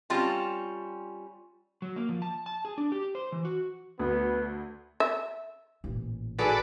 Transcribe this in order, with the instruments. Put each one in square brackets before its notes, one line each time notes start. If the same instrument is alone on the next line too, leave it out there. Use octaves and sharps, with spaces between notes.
[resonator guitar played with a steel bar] G3 C4 C#4 F4 A5
[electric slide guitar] F#3
A#3
F3
A5
A5
G#4
D4
G4
C5
E3
F#4
[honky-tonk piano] D2 [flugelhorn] B3
[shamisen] E5
[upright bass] A1 A#2
[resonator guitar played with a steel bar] F#3 G#4 [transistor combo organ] A4 B4 D5